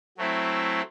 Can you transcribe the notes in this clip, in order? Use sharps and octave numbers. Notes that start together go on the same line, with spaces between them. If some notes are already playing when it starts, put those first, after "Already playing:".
F#3 A3 C4 E4